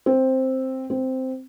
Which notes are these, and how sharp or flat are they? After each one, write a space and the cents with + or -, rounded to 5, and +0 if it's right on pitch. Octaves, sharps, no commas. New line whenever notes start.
C4 +5
C4 -5